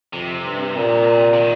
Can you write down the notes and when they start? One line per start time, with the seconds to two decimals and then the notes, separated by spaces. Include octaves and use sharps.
0.13 F2 C3
0.45 G2
0.76 A#2
1.33 C3
1.40 D#3